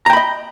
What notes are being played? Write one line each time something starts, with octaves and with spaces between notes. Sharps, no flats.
D#5 G5 A#5 B5